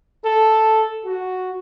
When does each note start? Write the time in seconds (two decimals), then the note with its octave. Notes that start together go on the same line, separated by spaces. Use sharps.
0.24 A4
1.05 F#4